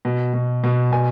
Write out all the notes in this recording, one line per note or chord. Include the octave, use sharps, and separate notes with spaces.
B2
B2
B2
B2 G#5